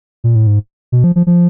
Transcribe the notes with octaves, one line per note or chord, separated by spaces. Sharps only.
A#2
A2
G#2
B2
F3
F3
F3